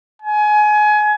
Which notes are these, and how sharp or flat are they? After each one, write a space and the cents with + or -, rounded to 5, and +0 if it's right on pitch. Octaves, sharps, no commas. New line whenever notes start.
G#5 +25